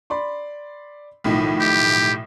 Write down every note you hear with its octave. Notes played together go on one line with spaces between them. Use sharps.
D5 B5 C6
B1 A2 D#3 F3 D#4
G4